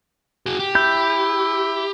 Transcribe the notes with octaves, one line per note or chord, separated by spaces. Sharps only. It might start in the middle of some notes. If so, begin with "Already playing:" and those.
F#4 G#4
G4
E4 G6